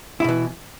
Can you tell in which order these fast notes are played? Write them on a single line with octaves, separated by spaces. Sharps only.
E4 B2 E3